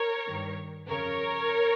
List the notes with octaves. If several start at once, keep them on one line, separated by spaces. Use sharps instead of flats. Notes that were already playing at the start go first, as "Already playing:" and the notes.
Already playing: A#4 C#5
G2 D#3
F2 C#3 A#4 C#5